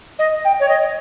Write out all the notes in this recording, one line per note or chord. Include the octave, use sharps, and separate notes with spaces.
D#5
G5
C#5
D#5